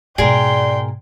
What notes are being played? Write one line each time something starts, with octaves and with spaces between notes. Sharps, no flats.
G#2 B2 G#4 A#4 D5 G5 C6